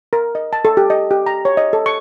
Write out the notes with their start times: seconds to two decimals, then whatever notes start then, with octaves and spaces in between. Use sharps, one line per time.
0.13 A#4
0.35 D#5
0.53 A5
0.65 A4
0.77 G4
0.90 D#5
1.11 G4
1.26 A#5
1.45 C#5
1.57 D#5
1.73 A4
1.86 C#6